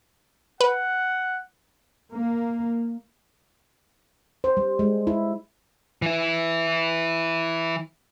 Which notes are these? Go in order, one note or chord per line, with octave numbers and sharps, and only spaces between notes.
B4 F#5
A#3
C5
G3
G#3
E4
E3 E4